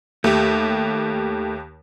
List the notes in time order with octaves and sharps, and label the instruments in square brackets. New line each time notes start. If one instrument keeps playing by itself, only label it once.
[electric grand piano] D#2 G4 [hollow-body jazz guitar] A3